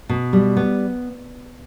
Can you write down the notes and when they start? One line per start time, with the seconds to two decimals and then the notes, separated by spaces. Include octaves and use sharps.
0.09 B2
0.33 G3
0.57 B3